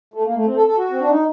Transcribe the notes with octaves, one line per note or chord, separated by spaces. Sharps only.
A3
A#3
A3
C4
A4
A4
F#4
C4
D4
D#4